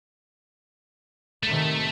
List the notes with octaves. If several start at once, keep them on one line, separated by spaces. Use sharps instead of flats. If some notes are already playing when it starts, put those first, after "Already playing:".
A2 C3 D#3 A3